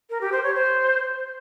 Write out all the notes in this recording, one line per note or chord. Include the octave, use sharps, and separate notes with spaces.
A#4
G4
C5
C#5
C5